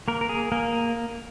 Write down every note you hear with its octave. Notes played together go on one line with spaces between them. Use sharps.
A#3 A#4
A#4
G#4
A#3 A#4